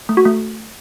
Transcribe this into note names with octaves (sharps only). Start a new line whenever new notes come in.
A3
F#4
A3